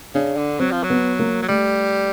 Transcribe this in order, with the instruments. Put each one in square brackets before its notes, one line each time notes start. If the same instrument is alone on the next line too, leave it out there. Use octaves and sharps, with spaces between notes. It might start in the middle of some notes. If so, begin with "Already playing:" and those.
[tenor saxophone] C#3 [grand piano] D4
[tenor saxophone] D3
[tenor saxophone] F#3 [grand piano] C4
[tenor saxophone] F3
F#3
[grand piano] B3
A#3
[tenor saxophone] F#3
[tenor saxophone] G3 [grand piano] A3